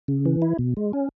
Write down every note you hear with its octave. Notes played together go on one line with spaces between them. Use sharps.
C#3
E3
E4
B2
G#3
C#4